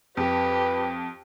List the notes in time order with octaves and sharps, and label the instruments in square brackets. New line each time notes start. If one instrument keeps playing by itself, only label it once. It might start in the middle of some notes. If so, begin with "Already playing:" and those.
[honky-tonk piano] F2 [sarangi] G4 [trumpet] B4